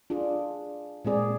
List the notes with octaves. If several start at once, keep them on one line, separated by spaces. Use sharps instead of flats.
D4 F4 G#4
A#2 G#3 C4 G#4 D5